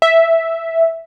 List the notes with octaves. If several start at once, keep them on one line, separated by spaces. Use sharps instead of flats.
E5